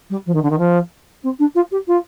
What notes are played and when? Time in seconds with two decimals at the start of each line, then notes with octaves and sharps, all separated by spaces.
0.10 G3
0.26 F3
0.34 D#3
0.42 D3
0.50 D#3
0.58 F3
1.23 C4
1.39 D4
1.55 F4
1.71 G4
1.87 F4